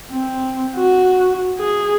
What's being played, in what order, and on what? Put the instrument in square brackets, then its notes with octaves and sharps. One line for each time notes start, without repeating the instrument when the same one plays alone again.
[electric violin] C4
F#4
G#4